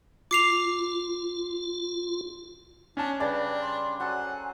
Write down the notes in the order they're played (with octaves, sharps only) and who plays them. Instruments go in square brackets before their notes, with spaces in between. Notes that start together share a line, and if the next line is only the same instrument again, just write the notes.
[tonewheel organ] F4 [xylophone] D6 C7 F7
[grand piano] C#4 A5 [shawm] D4
[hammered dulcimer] C#3 G3 [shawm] D4 [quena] B4 [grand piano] D5
[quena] C6
[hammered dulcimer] F#3 A4 C5 [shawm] F#5 [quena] G#5